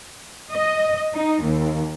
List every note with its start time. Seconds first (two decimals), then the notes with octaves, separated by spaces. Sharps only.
0.52 D#5
1.14 D#4
1.43 D#2